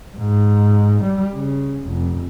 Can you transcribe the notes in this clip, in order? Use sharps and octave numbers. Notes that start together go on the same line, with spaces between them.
G#2
G3
C#3
F1